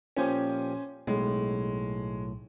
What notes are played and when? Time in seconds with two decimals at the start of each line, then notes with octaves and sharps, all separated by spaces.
0.17 A#2 F3 C#4 G4 C5 G#5
1.07 B1 A2 G#3